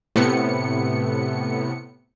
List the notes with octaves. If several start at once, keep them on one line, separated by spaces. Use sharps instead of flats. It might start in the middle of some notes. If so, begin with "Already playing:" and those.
A2 C3 B3 C#7